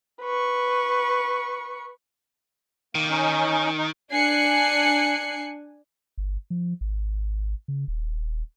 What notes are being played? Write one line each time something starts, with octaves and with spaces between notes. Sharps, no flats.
B4 C#6
D#3 A#3
C#4 D#4
D#4
D4 G#5 F#6 C7 C#7
G1
F3
G#1
C#3
D#1